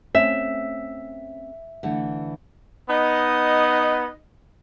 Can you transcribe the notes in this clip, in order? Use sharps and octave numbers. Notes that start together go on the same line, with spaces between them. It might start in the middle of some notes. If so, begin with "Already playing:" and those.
A3 C4 C#4 E5
D3 E3 A3
B3 D#4 D#5